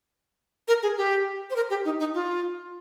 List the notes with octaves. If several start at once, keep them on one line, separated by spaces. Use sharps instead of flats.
A#4
G#4
G4
C5
A#4
G4
D#4
D#4
F4